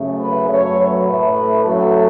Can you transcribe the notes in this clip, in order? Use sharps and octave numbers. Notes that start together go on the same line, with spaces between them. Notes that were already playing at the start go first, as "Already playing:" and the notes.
Already playing: F#2 C#3 A3
B4
F#2 F#3 A3 C#5
B4
A2 A3
F#2 F#3 A3 A4